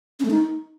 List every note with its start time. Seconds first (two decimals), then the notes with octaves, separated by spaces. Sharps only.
0.20 C#4
0.25 A3
0.30 D#4